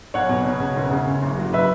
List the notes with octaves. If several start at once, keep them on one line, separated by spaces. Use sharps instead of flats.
B1 C#5 F#5
B2
B2
C#3
E1
C#3
C#3
F#1
F#3
B4 E5